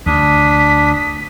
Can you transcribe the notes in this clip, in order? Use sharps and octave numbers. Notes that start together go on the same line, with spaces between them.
D2 D4 D#6 B6